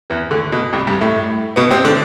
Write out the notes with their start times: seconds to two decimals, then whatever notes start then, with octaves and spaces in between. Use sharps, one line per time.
0.10 E2 E3
0.31 D2 D3
0.52 B2
0.73 C2 C3
0.87 G2 G3
1.01 A2 A3
1.56 B2 B3
1.70 C3 C4
1.85 D3 D4